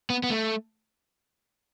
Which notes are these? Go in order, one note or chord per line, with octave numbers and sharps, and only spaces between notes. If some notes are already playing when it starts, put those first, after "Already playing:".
B3
B3
A3